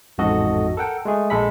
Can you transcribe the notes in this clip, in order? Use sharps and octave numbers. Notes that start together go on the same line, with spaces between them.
A1 F2 G#2 F#4 A4 D#5
A4 A#4 F#5 G5
G#3 A3 G#4
A#1 G#3 A4 B5 B6